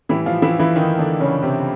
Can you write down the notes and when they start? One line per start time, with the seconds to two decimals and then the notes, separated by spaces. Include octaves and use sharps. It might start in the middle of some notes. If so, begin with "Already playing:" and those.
0.09 A2 E3 G3 E4
0.26 F3 F4
0.42 E3 E4
0.59 E3 E4
0.76 D#3 D#4
0.98 D3 D4
1.20 C#3 C#4
1.43 C3 C4